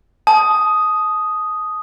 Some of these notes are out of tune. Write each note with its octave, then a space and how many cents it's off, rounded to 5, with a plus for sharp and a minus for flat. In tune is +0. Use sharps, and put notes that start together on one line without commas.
A5 -30 D#6 +0